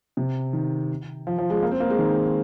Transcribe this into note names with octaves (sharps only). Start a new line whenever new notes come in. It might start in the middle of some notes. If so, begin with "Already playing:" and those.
C3
D#3
F3
F3
G#3
A#3
C4
A#3
G#3
D#3